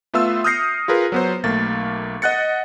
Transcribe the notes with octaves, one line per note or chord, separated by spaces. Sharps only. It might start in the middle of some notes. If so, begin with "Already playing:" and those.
A3 B3 F4 E5 C6 E6
D#6 F6 G6 A#6 C7 C#7
F4 G#4 A#4 B4
F#3 B3 C5
B1 A3 A#3 A6
D#5 F#5 F#6 A6 C#7